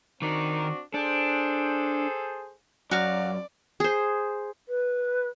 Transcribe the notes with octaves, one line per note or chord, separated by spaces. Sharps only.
D#3 C4 D4 F#4 A#4
D4 G#4 A4 C5
F#2 F#4 D5 F5
G#4 C5
B4